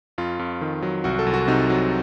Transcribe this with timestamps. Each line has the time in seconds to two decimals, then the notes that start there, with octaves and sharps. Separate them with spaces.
0.18 F2 F4
0.39 F2
0.61 D#3
0.82 F#3
1.04 C2 F#4
1.19 A4
1.27 C2
1.34 F#4
1.48 C3 D#4
1.70 F#3